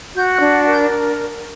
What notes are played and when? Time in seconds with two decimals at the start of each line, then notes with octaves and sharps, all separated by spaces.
0.16 F#4 G6
0.34 F#6
0.40 D4
0.65 A#4
0.71 G6